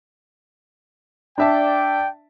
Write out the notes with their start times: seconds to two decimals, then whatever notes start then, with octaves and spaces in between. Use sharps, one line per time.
1.38 D4 D5 E5 G5 A5